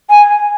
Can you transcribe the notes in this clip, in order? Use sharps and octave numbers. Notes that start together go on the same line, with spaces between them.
G#5